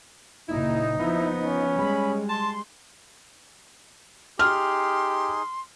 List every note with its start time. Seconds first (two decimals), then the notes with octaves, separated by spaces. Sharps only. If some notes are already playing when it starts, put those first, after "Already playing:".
0.48 F#1 A#2 D#4 E4
1.00 F3 B3 E4
1.41 C#4
1.77 G3 G#3 B5
2.29 A5 C6
4.39 D#4 G4 G#4 C6 F6